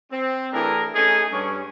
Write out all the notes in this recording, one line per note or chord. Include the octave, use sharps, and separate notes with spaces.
C4
E3 A3 D4 G#4 A#4
A3 C#4 D#4 G#4
G2 C#4